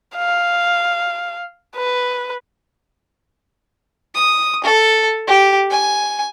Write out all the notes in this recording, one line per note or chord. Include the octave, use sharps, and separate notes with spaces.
F5
B4
D#6
A4
G4
G#5